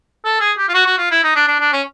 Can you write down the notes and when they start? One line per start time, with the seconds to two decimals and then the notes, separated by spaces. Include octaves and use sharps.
0.25 A4
0.40 G#4
0.58 G4
0.69 F4
0.74 F#4
0.86 F#4
0.98 F4
1.11 E4
1.24 D#4
1.36 D4
1.48 D4
1.60 D4
1.73 C#4